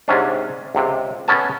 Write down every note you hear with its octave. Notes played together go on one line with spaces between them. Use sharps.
G#2 C3 C#4 D4
C#2 C3
B3 C#4 A4 G#5 A5